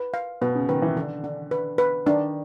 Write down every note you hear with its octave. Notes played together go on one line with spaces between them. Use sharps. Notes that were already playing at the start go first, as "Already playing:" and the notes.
Already playing: B4
F5
B2 B4
C#3
D#3 B4
E3
D3 D4
D4
B4
B4
D#3 D4